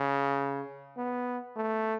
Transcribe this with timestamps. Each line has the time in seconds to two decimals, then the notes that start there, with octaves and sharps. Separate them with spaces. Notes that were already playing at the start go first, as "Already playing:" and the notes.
Already playing: C#3
0.97 B3
1.56 A3